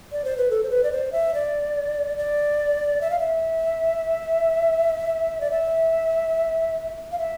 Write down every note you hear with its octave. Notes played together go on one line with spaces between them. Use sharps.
D5
C5
B4
A4
C5
B4
D5
C5
E5
D5
D5
E5
F5
E5
D5
E5
F5
E5